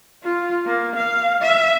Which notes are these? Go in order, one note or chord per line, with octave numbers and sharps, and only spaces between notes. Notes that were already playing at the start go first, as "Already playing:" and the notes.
F4
A#3
F5
E5